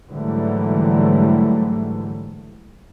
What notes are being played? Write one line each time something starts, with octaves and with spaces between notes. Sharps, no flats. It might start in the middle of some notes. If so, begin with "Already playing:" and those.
G#2 D3 E3 F#3 G3 A3